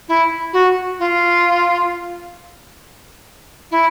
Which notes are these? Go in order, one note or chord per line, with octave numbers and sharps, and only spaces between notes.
E4
F#4
F4
E4